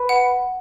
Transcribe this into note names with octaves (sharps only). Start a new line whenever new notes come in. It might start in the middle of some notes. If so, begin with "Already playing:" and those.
Already playing: B4
F#5